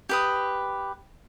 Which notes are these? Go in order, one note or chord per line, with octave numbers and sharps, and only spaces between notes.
G4 B4 D#6